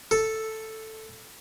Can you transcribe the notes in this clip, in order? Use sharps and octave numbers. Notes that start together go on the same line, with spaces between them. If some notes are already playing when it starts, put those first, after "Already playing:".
A4